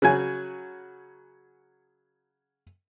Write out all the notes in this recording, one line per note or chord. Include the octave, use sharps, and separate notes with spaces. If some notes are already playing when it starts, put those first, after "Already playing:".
C#3 F#3 G#5